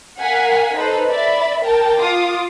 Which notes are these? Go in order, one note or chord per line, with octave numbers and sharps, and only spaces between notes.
A#4 F5 F#5 G#5 B6
D#4 A4 B4 C5
D5 E5 B5
A#4 G5 A5
F4 D6 D#6